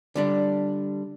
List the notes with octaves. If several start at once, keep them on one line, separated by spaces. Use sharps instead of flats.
D3 G3 D4